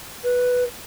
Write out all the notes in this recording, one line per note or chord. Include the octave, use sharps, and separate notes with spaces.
B4